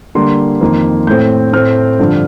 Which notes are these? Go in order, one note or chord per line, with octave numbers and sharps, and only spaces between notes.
D3 G3 A#3 C6
F2 D#3 A#3
A2 A3 C4 G6
A2 A3 C4 F6
G2 D3 F3